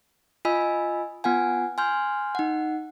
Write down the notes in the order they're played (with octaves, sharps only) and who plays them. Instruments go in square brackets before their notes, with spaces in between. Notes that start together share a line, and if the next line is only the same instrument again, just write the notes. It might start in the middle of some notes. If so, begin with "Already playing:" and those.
[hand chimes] F4 D#5 G#5 B5 E6
B3 F4 F#5 G#5
G#5 C6 F6 G6
D#4 F#5